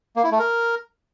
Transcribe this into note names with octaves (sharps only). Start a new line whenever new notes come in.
A#3
E4
A3
A#4